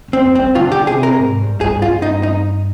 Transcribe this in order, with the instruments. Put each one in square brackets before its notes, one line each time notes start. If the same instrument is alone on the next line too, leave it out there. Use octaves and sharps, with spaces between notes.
[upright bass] G2 [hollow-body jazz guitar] C4
[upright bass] F2
[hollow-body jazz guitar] C4
[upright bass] G2
[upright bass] D3 [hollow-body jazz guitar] F4
[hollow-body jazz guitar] G4
[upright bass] C3 [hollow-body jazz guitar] G#4
[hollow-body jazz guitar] A#4
[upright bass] G#2
G2
[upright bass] G2 [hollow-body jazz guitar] G#4
[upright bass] G2 [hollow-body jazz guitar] F4
[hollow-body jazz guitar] D#4
D#4